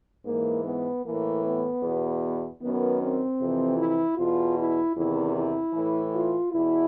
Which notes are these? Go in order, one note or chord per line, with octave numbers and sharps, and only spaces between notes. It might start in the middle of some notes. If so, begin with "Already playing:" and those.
G#2 E3 A#3
B3
A2 E3 A#3
B3
E2 B2
F#2 D#3 B3
C4
F2 C3 E3
E4
E2 B2 F4
E4
E2 C3 D#3 E4
E4
A2 E3
F4
E2 B2 E4